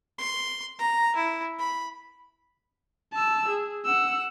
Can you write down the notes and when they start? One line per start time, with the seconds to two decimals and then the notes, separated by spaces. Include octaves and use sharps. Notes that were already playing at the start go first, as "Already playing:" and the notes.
0.18 C6
0.79 A#5
1.16 E4
1.59 B5
3.13 A5 E6
3.49 G#4
3.85 F#5 E6